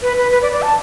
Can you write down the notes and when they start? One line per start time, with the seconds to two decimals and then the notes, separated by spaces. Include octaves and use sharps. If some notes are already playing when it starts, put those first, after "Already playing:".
0.02 B4
0.18 B4
0.32 B4
0.42 D5
0.52 D5
0.62 A5